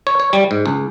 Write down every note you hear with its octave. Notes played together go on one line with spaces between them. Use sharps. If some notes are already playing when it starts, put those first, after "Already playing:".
C#5
C#5
G3
G#2
C#2